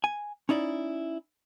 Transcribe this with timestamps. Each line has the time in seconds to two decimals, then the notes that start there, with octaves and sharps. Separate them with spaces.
0.04 G#5
0.49 C#4 D#4 E4 D5